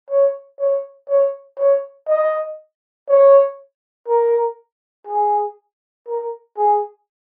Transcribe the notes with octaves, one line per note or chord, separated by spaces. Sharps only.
C#5
C#5
C#5
C#5
D#5
C#5
A#4
G#4
A#4
G#4